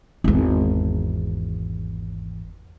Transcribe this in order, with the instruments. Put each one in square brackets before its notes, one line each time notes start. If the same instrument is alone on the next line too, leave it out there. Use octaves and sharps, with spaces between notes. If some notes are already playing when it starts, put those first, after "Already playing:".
[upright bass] G#1 E2